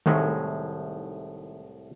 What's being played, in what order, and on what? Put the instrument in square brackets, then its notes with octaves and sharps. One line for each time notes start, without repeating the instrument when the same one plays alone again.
[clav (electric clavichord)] C2 A2 G#3 [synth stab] D#3 A3